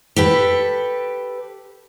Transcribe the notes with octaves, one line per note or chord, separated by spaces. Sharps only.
G4 A4 B4